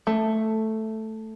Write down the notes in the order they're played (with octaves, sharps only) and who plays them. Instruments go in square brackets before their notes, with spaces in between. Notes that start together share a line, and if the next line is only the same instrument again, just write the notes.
[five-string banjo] A3